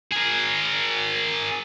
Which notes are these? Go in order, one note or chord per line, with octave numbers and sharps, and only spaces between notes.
G#4 A#4